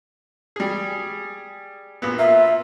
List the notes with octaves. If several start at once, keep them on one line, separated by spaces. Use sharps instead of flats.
G3 G#4
A#1 B3
A#3 F4 E5